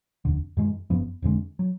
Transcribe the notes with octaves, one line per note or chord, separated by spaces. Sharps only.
F1 D#2 D3
F#2 D#3 G#3
F#1 F#2 F3 B3
F1 F2 D3 G#3
F#3